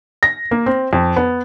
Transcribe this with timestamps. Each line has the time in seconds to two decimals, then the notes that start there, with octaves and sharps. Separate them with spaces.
0.23 A#6
0.51 A#3
0.66 C4
0.93 F2
1.16 B3